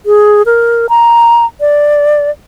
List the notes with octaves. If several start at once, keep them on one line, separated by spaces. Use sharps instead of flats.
G#4
A#4
A#5
D5